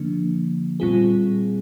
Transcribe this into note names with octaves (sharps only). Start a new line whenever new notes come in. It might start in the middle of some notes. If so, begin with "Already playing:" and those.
Already playing: D3 F3 A#3 D4
A#2 G3 C4 F4 G#4